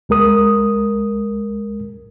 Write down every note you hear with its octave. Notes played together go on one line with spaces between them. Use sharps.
C#2 G#3 A#4 D#6